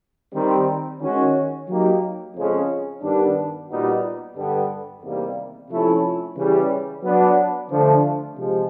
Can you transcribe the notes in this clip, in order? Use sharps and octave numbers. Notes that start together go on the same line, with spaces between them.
D#3 G3 C4
D#3 G#3 C#4 F#4
F#3 A#3 D#4 G4
F2 C#3 F3 G#3 C#4
G2 D#3 G3 B3 D4
A#2 G3 B3 D#4 F#4
G2 D3 G3 B3
E2 C3 D#3 G3 A#3
C3 F3 A3 C#4 E4
C#3 E3 G3
F#3 B3 D4
D3 F3 A3 D4
C3 F3 G#3